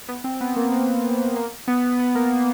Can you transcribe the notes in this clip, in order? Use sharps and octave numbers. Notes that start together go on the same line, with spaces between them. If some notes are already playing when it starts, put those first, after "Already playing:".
B3
C4
B3
A#3
A#3
A#3
B3
B3
A#3
A#3